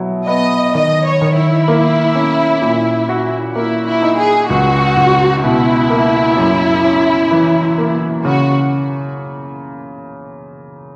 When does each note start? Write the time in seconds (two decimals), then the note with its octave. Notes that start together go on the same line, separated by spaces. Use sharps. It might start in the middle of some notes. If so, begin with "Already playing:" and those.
Already playing: B2 F#3 E4
0.27 B3 D#5
0.74 D#3 D#5
1.06 C#5
1.21 D#3
1.37 E4
1.68 A#3
2.15 C#4
2.62 A#2
3.09 F#4
3.56 A#3 E4
3.87 E4
4.03 D#4
4.18 G#4
4.50 C#2 F#4
4.97 C#2
5.44 B2 E4
5.90 A#3
6.37 F#2
6.84 C#4
7.31 E3
7.78 A#3
8.25 C#3 F#4